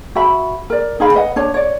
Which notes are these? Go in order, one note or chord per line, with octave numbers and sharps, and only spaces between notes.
F#4 E5 B5
A#4 D5
D#4 G#4 F5 B5
B4 D#5 F#5
D4 C#5 A5
C#5 D5